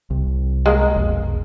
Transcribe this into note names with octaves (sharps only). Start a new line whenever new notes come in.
C2
G#3 A#3
F1 B1